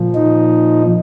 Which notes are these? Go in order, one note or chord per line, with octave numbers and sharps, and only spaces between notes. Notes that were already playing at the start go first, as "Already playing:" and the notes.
Already playing: A#2 F3
D#4